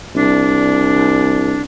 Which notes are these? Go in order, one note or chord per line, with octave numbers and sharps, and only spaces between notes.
C2 D4